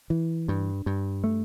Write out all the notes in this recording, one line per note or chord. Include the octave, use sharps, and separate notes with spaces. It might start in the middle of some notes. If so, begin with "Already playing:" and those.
E3
G2
G2
A3